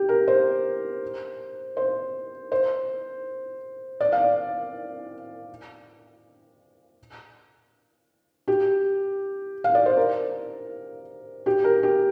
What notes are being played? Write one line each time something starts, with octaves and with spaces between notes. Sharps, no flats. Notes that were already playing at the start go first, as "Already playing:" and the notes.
Already playing: G4
A#4
C5
C5
C5
D5
F5
D5
G4
F5
D5
C5
A#4
G4
A#4
G4